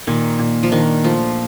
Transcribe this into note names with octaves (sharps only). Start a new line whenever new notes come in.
A#2 D#3
A#2
F3
D#3 D4
F3 A3